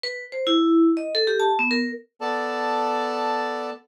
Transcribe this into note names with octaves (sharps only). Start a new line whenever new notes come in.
B4
C5
E4
D#5
A4
G4
A5
B3
A#4
B3 A4 D5 A5